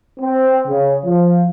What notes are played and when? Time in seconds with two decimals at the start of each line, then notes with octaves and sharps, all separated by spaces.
0.20 C4
0.68 C#3
1.05 F3